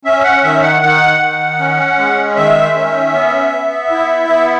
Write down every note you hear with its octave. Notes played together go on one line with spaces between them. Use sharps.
C#4 E5
F#5
D#3 E5
F#5
D#3 F#5
D#3
C#4
G#3
D#3 E5
C#4
B3
B3
E4
B3